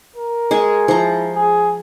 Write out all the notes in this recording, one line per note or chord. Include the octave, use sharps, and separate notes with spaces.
A#4
G#3 G#4 C#6
F3 E4 A#5
G#4